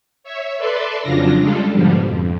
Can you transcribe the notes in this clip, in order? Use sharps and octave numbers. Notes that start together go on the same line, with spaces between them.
C#5 E5
A4 B4 D5 E5 C6
F2 C#3 F#3 D4 F4 A#6
C#3 G3 G#3 D4 F4 A4
G#2 B2 D3 F3 G3
F2